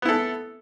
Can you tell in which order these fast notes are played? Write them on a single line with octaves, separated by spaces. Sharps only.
B3 E4 A4